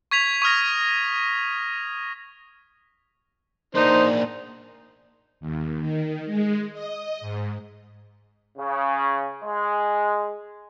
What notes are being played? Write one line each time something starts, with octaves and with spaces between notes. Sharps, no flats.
C#6 G#6 B6 F7
C#6 D#6 F6 A#6
A#3 D4 D#4 C5
D#2
D#3
G#3
D#5
G#2
C#3
G#3